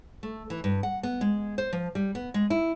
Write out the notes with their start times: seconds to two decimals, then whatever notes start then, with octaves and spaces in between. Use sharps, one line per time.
0.23 A3
0.50 E3
0.64 G2
0.83 F#5
1.03 B3
1.21 G#3
1.58 C5
1.73 F3
1.95 G3
2.15 B3
2.34 G#3
2.50 E4